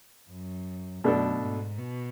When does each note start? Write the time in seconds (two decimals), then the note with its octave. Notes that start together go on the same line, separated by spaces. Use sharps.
0.31 F#2
1.04 F#2 B2 A3 D4 A4
1.41 G#2
1.78 B2